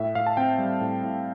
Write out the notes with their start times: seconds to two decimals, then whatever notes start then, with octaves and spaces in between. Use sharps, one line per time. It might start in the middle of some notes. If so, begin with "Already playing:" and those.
Already playing: A2 E5
0.15 A2 F5
0.26 A5
0.37 C4 G5
0.58 G3
0.81 A2
1.03 A2